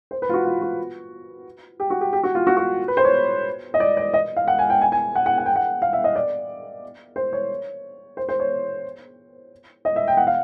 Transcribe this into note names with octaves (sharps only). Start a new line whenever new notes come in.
C5
B4
F4
F#4
F4
F#4
G4
F#4
G4
G4
F#4
F4
F#4
F#4
B4
C5
C#5
D#5
D5
D5
D#5
F5
F#5
G#5
G5
G#5
G#5
F#5
F#5
F#5
G5
F#5
F5
E5
D#5
D5
C5
C#5
C5
C5
C#5
D#5
E5
G5
F#5
F5